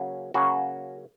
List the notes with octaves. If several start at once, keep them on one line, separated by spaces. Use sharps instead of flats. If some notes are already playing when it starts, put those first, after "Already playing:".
Already playing: C#3 F#3 A#3 C#4
C#3 F#3 A#3 C#4 F#4